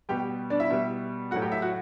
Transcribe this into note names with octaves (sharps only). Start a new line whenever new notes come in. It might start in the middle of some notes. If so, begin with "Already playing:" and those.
B2 G3 G4
D4 D5
E4 E5
B2 G3
A2 F#3 A3 F#4 F#5
G4 G5
E4 E5
F#4 F#5